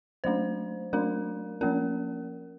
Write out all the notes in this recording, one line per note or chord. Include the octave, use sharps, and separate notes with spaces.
F#3 A3 D4 C5
F#3 A3 D4 A#4
F3 A#3 C#4 A#4